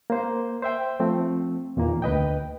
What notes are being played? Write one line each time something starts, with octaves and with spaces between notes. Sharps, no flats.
A#3 C5
C5 E5 G5
F3 A3 C4
E2 A#2 D#3 A#3
D2 B4 D#5 G5